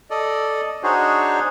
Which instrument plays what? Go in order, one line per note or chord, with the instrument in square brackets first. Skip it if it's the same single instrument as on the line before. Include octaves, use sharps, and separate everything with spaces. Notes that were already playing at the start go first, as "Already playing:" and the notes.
[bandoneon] A4 D5 D#5
D4 D#4 F#4 G#4 C5 C#5